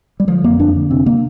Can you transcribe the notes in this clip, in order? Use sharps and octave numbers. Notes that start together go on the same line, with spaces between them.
G3
D3 F3
F2 A#3
F2 D4
D3
C3 C4
A#3